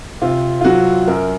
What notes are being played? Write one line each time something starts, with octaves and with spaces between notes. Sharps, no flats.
C3 F4
F4
F#3 F#4
F#2 A#4